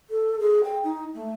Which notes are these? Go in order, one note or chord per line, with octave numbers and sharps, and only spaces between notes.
A4
G#4
G5
D#4
A3